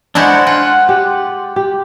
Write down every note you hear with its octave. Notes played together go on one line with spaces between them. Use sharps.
G#3 D4 E4 F#4 C5 F#5
F4 F#5
G4
G4